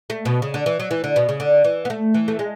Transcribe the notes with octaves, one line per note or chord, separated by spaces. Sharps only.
A3
B2
C#3
D3
E3
F#3
E3
D3
B2
C#3
D3
E3
B3
A3
E3
A3
G#3